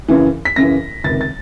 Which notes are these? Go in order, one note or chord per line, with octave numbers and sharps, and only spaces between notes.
F#2 C#3 E3
B6
F#2 C#3 E3 A#6
C#2 C3 D#3 A6
A6